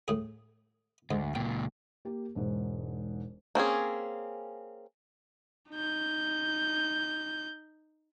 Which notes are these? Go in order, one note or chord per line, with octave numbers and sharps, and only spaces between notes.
A2 G#4
D2 G#2
C#2 A#2 G5
A#3 G4 A#4
E1 G#2
A#3 C4 C#4 G#4
D#4 G6